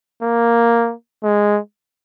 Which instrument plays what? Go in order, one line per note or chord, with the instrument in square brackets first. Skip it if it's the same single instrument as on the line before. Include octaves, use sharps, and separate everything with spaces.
[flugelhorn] A#3
G#3